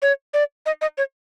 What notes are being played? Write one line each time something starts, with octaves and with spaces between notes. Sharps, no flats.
C#5
D5
D#5
D#5
C#5